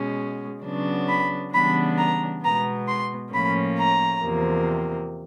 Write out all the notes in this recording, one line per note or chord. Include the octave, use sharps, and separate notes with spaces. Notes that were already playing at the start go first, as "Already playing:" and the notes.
Already playing: B2 G#3 C#4
C#3 F#3 B3 D4
B5
C#3 E3 G3 B3 D4 B5
A#5
B2 G#3 B3 A#5
C6
A2 F3 A#3 C#4 B5
A#5
E2 C3 F3 A#3